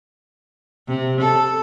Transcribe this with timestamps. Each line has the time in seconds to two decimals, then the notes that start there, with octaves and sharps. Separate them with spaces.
0.88 C3
1.21 A4